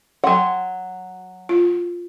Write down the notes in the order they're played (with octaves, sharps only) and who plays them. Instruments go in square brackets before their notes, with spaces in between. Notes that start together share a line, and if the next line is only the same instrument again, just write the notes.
[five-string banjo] F#3 F#5 [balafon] G5 C6
[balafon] F4